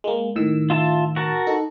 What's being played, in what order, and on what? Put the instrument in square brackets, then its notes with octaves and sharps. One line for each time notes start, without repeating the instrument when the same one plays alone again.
[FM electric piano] G#3 A#3
A2 D#3 E6
[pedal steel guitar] F4 E5 A5
F#4 A#4 A5
[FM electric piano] D#4 A4